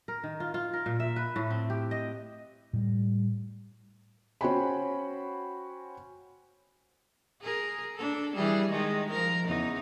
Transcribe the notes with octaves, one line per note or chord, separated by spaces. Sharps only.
A#4
D#3
F4
F4
A#4
A#2
E5
B4
A2
C4
G4
D#5
A2 G3
C#4 F#4 C5 G5 G#5 B5
G#4 A#4
D4 A4
E3 G3 G#4
D#3 G#3 D#4
F3 A#4
E2 C#3 D#4